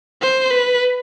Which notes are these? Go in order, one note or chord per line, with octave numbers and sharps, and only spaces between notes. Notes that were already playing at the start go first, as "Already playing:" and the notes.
C5
B4